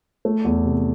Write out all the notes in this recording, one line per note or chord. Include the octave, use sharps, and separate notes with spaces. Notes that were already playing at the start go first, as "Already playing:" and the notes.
A3
E2
C3